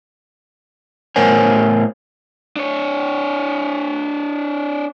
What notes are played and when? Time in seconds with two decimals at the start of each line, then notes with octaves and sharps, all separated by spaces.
1.16 A2 B3 A#4 C5 C#5 G#5
2.56 D4 C#5